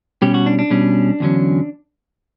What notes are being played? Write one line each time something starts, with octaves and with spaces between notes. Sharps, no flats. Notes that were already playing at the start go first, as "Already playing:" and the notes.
B2 G3 C#4 G4
F#4
D4
D4
B2 G3 C#4
E2 D3 F#3 C#4